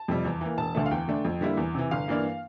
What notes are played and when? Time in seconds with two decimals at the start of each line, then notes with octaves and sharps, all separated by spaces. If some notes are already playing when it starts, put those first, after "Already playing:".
Already playing: A5
0.08 F2 C3 G3
0.25 E2
0.41 E3 A#3
0.58 E1 A5
0.75 D2 D3 A3
0.86 F5
0.91 E2 G5
1.08 D3 A3 D4
1.25 F2
1.41 D3 G3 A#3 E4
1.57 E2
1.75 C3 E3
1.91 G1 F5
2.08 G2 E3 A#3 D4